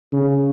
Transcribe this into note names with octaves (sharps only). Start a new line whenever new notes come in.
C#3